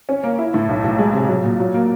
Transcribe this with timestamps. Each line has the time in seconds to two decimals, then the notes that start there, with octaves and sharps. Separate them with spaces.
0.09 C#4
0.24 A#3
0.39 E4
0.54 A2
0.69 B1
0.84 B1
0.99 G#3
1.13 C3
1.28 F#3
1.44 A#2
1.60 F#3
1.74 A#3